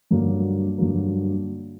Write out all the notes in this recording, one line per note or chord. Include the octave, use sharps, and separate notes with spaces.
G2 D3 F#3 A#3
G2 D3 F#3 A#3